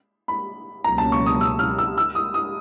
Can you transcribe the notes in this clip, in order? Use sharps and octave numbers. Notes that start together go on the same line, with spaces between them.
B5
C#2 B2 F#3 A#3 C#4 A#5
A5
C#6
D#6
E6
F6
E6
E6
D#6
D#6